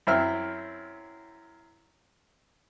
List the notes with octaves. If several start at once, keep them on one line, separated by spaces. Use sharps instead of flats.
F#2 C4 E4 E5 F6